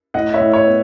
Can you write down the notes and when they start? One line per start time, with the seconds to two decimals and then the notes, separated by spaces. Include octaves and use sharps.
0.14 A2 D#5 F#5
0.34 C#5 E5
0.40 A2
0.53 C#5
0.66 B3